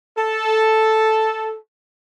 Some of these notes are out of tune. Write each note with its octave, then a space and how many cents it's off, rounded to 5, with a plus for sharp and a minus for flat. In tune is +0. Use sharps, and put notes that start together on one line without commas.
A4 +0